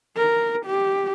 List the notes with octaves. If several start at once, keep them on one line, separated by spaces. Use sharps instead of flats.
A#4
G4